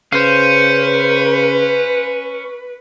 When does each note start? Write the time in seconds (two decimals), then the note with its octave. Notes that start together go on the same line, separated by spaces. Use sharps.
0.12 C#3 C#4 B4 C5 F5